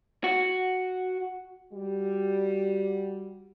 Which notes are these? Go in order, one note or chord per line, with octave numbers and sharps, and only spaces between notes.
F#4
G3 F#4